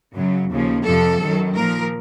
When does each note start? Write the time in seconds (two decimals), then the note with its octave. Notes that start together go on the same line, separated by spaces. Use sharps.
0.14 F#2 C#3 F#3
0.50 D#2 C#3 F3
0.85 F2 C3 F3 A4
1.20 F#2 D#3 F#3
1.55 A#2 F3 A#4